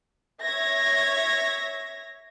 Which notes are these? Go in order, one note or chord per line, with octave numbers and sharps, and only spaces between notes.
C#5 E5 G#6 A#6